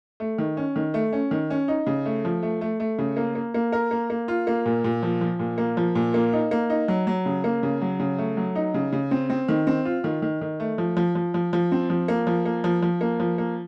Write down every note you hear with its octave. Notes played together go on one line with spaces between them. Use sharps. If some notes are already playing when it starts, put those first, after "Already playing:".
A3
D#3
C#4
D#3
A3
C#4
D#3
C#4
D#4
C#3
A3
F3
A3
A3
A3
C#3
A#3
A#3
A#3
A#4
A#3
A#3
F4
A#3
A#2
A#2
F3
F3
A#2
A#3
F3
A#2
A#3
D#4
A#3
D#4
F#3
F#3
C#3
A#3
C#3
F#3
C#3
A3
F#3
D#4
C#3
C#3
C4
C4
D#3
C4
F4
D#3
D#3
D#3
A3
F3
F3
F3
F3
F3
C4
F3
A#3
F3
A#3
F3
F3
A#3
F3
A#3